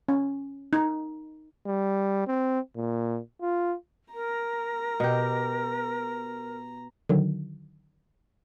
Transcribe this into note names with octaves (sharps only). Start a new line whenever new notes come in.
C#4
D#4
G3
C4
A#2
F4
A#4 A#5
B2 G4
D3 D#3 F#3